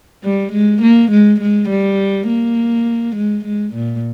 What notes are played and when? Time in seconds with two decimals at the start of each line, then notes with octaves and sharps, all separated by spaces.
0.24 G3
0.53 G#3
0.82 A#3
1.11 G#3
1.41 G#3
1.69 G3
2.28 A#3
3.16 G#3
3.45 G#3
3.74 A#2